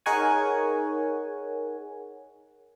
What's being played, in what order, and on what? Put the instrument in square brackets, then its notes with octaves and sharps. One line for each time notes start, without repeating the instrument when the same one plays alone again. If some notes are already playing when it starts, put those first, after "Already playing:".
[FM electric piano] D#4 G#4 A#4 C#5 F#5 G#5